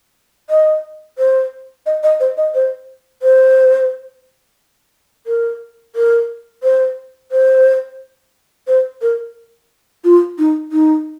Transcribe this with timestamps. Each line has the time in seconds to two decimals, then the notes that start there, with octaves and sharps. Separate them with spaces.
0.50 D#5
1.18 C5
1.86 D#5
2.03 D#5
2.20 C5
2.37 D#5
2.55 C5
3.23 C5
5.27 A#4
5.96 A#4
6.63 C5
7.32 C5
8.68 C5
9.02 A#4
10.04 F4
10.38 D#4
10.72 D#4